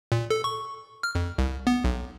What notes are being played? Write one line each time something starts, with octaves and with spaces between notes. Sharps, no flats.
A#2
A4
C#6
F6
F2
C2
B3
B1